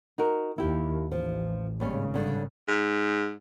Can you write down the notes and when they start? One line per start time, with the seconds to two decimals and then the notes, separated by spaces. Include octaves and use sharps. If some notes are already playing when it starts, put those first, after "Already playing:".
0.18 D#4 F#4 A#4
0.58 D#2 E4 G4
1.12 A1 F3
1.80 G#1 D#2 C#3 G3 C#4
2.14 G2 D3
2.68 G#2